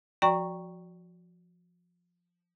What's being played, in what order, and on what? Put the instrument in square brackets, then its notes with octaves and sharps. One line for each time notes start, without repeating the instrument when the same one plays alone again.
[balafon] F3 F#4 D5 G5 A#5 C#6